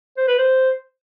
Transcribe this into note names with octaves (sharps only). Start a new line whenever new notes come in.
C5
B4
C5